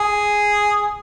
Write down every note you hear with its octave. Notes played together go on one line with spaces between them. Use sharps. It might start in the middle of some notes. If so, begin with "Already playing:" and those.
Already playing: G#4